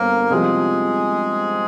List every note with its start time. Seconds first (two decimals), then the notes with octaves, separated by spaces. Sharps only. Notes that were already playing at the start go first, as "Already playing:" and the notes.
Already playing: G1 G3 A#3 C4 A#4
0.30 C2 C3 F3 G#3 G#4